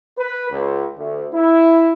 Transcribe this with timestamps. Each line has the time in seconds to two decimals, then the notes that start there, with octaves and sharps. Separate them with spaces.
0.18 B4
0.51 C#2
0.96 D2
1.33 E4